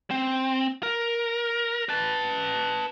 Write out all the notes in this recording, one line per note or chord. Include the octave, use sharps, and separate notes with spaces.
C4
A#4
B4 A5